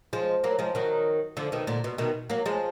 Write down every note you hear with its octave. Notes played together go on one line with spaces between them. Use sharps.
F3 G#3
F#3 A#3
F3 G#3
D#3 F#3
D3 F3
B2 D#3
A#2 D3
B2
B2 D#3
F#3 A#3
F3 G#3